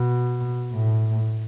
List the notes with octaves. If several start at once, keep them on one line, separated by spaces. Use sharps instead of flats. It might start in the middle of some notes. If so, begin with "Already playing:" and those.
Already playing: B2
A2